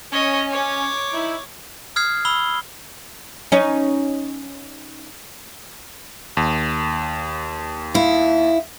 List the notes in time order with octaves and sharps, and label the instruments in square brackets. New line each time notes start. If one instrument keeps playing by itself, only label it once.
[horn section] C#4 [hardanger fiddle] C#5 D#5
[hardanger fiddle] C#5 D6
[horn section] D#4 E4
[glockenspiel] D#6 F6 G#6 C7
B5 E6 G7
[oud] C#4 D#4
[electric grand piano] D#2
[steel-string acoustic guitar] E4 F5